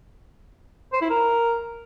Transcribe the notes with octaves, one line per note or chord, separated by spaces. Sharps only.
C5
E4
A#4